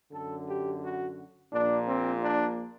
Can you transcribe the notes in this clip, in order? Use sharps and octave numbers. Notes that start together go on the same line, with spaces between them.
F#2 D3 A4
G4
F#4
A#1 A#2 D4
C4
D4